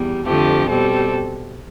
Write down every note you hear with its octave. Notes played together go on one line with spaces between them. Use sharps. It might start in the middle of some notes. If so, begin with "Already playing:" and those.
Already playing: E2 G3
F2 D3 F3 A3 G4
B2 G3 C4 A4